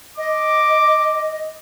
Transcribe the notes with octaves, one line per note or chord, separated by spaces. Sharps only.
D#5 D6